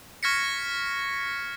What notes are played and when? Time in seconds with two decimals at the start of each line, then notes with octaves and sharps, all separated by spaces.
0.23 C#6 F6 G#6 A#6 B6 C#7